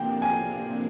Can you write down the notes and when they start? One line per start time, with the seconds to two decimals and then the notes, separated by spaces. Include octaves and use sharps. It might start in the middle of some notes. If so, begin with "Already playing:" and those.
Already playing: C3 F3 A#3 D4 G5
0.22 G#5